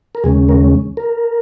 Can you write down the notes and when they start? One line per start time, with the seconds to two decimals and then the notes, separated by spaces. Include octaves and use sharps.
0.15 A#4
0.24 D#2 C#3 G#3 C#4 G#4
0.49 A#4
0.97 A#4